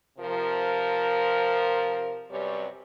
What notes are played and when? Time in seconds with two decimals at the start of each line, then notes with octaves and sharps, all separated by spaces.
0.18 C3 F3 A#4
2.31 F#2 C3 G3 B4 C#5 D5